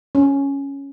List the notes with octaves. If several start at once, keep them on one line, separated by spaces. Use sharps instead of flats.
C#4